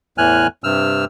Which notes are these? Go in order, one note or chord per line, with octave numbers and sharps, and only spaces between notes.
E2 A2 E3 G#5 F6 F#6
G2 C3 E6 F6